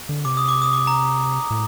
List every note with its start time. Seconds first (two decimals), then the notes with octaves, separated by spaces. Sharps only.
0.09 D3
0.25 C3 D6
0.37 D#6
0.48 D6
0.62 D#6
0.73 D6
0.87 A#5
1.50 A2